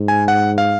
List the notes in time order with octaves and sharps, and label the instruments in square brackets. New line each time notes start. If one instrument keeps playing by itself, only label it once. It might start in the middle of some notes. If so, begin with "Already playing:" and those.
Already playing: [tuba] G#2
[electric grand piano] G#5
F#5
F5